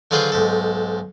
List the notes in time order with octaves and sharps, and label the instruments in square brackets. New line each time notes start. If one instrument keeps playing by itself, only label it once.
[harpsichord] D3 F#3 F4 G#4 B4 C5
B1 G#2 A4